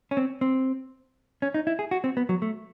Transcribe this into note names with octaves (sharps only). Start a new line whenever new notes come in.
C#4
C4
C4
C#4
D#4
E4
G#4
F#4
C4
B3
F#3
A3